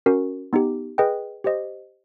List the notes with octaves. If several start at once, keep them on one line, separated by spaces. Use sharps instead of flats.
C#4 F#4 A#4
B3 D#4 G4
G#4 B4 D#5 G5
G4 C5 D#5